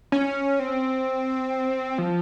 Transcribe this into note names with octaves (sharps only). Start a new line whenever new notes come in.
C#4
C4
F3